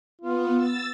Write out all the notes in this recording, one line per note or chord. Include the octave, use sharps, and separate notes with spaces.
B3 F4
E6 A6